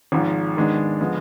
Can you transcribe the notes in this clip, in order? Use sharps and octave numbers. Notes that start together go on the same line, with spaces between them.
G#1 G#2 F3
D#2 D#3 G#3 B3 D4
D3 F3 G#3 B3